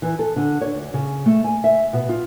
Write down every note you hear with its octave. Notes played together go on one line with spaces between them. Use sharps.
E3
A4
D3
C#5
D2
C#3
A3
G#5
E5
B2
F4